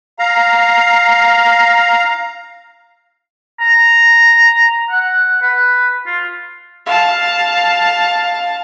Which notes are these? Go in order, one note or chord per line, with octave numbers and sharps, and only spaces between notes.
F5 A#5
A#5
F#5
B4
F4
F5 A5